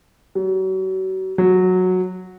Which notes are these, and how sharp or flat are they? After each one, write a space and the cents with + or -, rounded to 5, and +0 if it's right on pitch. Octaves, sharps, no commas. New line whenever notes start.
F#3 +35
F#3 -10